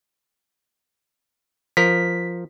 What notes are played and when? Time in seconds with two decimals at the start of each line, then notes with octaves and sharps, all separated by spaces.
1.77 F3 A#4 B6